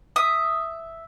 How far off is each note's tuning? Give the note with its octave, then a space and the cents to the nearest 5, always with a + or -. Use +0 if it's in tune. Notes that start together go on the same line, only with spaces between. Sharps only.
E5 +0 D#6 +0